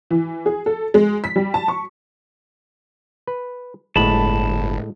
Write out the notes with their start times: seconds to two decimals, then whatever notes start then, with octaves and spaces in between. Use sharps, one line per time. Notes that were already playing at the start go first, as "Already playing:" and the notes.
0.11 E3
0.46 G#4
0.66 A4
0.94 G#3
1.24 B6
1.36 G3
1.54 A5
1.68 C#6
3.27 B4
3.96 G1 A2 G#3 A5 B5